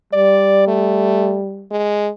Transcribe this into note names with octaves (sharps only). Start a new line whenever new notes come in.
G3 D5
A3
G#3